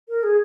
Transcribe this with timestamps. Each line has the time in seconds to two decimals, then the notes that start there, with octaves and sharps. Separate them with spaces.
0.09 A#4
0.23 G#4